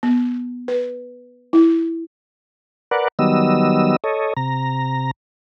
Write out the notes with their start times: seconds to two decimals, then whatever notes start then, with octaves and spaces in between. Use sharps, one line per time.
0.03 B3
0.68 B4
1.53 E4
2.91 A#4 B4 D5 F#5
3.19 D#3 F#3 G3 B3 D#5 E6
4.04 A4 C#5 D#5
4.37 C3 A#5